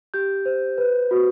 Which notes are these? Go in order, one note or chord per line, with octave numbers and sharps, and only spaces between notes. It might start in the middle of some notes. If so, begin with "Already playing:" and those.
G4 G6
C5
B4
F#4